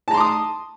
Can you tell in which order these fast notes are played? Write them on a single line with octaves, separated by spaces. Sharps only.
A5 A#5 C6 D6 D#6